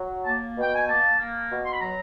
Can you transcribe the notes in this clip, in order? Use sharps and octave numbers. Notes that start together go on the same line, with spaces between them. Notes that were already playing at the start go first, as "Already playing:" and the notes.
Already playing: F#3
A#3 A5
B2
G5
G#5
A#3 A5
A#3
B2
C6
B5
F#3 A#5